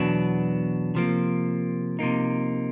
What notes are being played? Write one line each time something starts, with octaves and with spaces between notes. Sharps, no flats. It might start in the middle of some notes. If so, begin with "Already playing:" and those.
Already playing: E2 B2 F#3 B3 D4
C3 F3 A#3
C3 F3 A#3 D#4